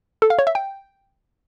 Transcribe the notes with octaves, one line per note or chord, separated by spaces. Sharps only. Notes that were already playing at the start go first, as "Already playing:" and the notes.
A4
F5
C#5
E5
G5